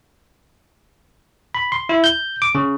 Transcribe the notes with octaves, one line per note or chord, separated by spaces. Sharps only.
B5
C6
E4
G6
D6
C#3